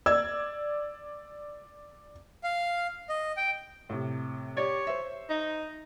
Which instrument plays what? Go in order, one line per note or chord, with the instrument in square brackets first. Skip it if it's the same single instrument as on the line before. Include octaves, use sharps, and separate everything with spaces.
[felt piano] D5 E6 G#6
[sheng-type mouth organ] F5
D#5
G5
[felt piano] A2 C3
[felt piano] G4 D5 [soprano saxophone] C#5
[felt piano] C5 E5
[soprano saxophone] D#4